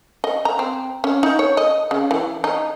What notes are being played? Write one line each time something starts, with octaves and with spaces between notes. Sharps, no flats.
D#5
A#5
C4
C#4
D#4
C#5
D#5
C#3
E3
D#4